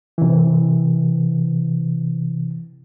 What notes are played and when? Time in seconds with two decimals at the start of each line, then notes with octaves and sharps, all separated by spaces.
0.18 C3 E3